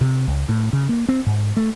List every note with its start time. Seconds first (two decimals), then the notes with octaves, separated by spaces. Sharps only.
0.01 C3
0.27 C#2
0.49 A2
0.73 C#3
0.89 A#3
1.09 C4
1.26 G#2
1.57 A3